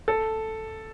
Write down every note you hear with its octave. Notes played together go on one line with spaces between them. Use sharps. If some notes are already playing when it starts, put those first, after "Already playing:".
A4